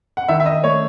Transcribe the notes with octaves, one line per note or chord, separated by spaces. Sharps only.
F#5
D#3 E5
E5
D#5
A3 C#5